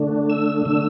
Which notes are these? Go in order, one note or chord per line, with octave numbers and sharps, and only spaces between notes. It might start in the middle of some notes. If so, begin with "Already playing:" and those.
Already playing: D3 A3 D4
E6
D3 A3 D4 E6